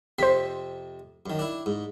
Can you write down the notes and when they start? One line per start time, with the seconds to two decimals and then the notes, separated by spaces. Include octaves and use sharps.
0.19 F2 C3 C4 C5 B6
1.26 F#2 D#3
1.39 D4 E4
1.66 G#2